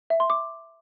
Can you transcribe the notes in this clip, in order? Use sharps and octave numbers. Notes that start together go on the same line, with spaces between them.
E5
C6
D6